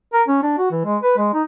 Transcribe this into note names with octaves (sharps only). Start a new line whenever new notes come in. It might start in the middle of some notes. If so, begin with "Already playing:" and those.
A#4
C#4
D4
F#4
E3
G#3
B4
G#3
D#4